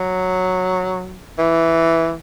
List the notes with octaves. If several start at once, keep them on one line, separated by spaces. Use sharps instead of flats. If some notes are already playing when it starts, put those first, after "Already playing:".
Already playing: F#3
E3